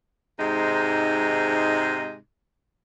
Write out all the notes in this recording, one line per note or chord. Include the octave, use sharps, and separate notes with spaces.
G#2 C3 G#3 D#4